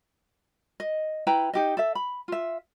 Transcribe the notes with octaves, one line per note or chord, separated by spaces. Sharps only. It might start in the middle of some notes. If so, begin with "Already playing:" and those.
D#5
E4 B4 G5 A#5
D#4 G4 D#5
A4 E5
B5
F4 E5